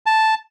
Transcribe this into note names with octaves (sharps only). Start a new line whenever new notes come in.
A5